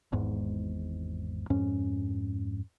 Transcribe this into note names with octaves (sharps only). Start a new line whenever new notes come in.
G#1 E2 G#2
F2 G#2 C#4